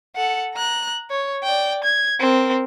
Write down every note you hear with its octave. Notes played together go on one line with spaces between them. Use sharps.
A4 F#5
A#5 F#6
C#5
D5 G5
G#6
C4 A#4